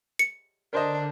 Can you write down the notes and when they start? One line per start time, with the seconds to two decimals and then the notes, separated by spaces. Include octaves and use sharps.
0.19 C#7
0.73 D3 D4 A#4 C5 D#5